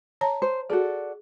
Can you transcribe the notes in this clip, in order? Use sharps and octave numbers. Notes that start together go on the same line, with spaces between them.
C#5 A5 A#5
C5
F#4 G#4 A4 D5